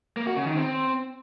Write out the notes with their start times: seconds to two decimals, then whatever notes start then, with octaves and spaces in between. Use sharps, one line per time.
0.17 A#3
0.27 F#4
0.37 C#3
0.47 D#3
0.56 C4